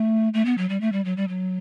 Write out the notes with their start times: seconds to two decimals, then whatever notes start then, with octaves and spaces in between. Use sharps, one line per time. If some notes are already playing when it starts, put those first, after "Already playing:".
Already playing: A3
0.34 A3
0.45 B3
0.58 F#3
0.69 G3
0.81 A3
0.92 G3
1.05 F#3
1.17 G3
1.28 F#3